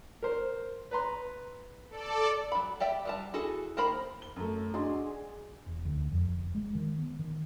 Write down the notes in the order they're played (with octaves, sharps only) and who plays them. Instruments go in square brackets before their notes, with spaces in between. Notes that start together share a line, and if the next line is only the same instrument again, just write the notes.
[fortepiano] A#4 C5
B4 A#5 C6
[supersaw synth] A4 D5
[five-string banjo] F#3 B5
G4 D5 E5 G5
F#3 G3 A5
E4 F#4 G#4 A4
D#3 A#3 A#4 C5 B5
[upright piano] G7
F#2 A3
D4 F#4 G#4 D#5 C6
G#4
[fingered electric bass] E1
D2
F2
F1
G#3
D#3
B3
D#3